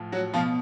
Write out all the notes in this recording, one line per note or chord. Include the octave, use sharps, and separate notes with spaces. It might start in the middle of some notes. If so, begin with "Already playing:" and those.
Already playing: A2 F3
F#3 F#4
B2 F3 F4